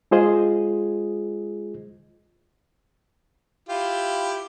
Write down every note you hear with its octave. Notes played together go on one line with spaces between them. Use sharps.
G#3 F4 G#4 C5 D#5
E4 F4 G4